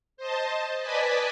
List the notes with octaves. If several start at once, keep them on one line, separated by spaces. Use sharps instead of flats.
C5 D#5 A5
B4 D5 D#5 G#5 A5 B5